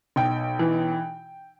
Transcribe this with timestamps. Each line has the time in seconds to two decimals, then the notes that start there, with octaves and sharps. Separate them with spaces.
0.16 B1 G5
0.59 E3